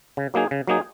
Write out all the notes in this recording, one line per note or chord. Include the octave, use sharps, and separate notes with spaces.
C#3
F#3 A#3 D#4 G#4
C#3
F#3 A#3 D#4 G#4